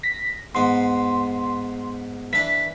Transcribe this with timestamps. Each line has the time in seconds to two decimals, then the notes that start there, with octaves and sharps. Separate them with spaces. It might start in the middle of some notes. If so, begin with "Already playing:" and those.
0.03 A#6 B6
0.55 G#2 B3 C6
2.33 E3 D4 B6